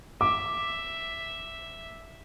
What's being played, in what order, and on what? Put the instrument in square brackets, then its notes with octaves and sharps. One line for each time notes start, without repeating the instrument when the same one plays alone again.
[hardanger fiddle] E5 [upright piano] D6